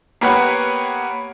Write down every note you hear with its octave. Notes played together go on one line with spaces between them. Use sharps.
A#3 B3 G4 B4 C#5 F#5